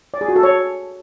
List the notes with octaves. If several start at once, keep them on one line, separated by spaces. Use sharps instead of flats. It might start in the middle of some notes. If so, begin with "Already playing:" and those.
D5
G#4
F#4
A4
C#5